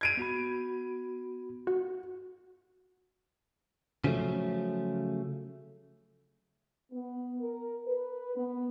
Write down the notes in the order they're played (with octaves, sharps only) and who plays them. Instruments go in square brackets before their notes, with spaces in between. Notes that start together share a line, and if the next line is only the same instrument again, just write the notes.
[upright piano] G#6 D7 D#7
[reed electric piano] B3 F#4 B5
[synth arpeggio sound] F#4
[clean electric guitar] C#3 F3 F#3 A3
[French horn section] B3
A#4
B4
B3